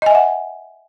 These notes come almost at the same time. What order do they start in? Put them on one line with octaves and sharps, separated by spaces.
D#5 G#5 E5 F#5